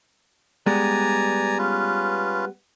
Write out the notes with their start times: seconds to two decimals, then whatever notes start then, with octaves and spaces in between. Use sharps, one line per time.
0.66 G3 G#3 B3 D5 G#5 A#5
1.58 C#4 F4 B4